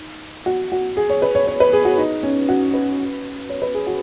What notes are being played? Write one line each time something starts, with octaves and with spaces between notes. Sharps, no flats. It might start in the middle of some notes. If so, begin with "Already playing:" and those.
Already playing: D#4
F#4
F#4
G#4
C#5
B4
C#5
C#5
B4
G#4
F#4
D#4
C#4
F#4
B4
C#5
B4
G#4
F#4